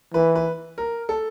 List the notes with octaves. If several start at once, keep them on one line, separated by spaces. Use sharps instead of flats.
E3 B4
B4
A#4
A4